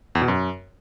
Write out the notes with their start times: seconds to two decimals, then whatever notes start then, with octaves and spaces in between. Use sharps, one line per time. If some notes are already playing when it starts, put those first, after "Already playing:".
0.15 E2
0.22 B2
0.28 F#2